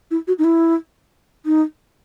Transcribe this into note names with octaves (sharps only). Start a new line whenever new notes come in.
E4
F#4
D#4
E4
D#4